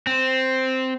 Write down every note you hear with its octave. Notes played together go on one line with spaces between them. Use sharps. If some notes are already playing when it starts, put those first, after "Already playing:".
C4